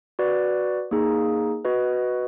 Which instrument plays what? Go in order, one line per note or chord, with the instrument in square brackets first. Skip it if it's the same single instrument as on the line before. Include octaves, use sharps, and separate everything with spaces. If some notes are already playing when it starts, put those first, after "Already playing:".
[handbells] F#4 B4 D5
A#3 D#4 G#4
F#4 B4 D#5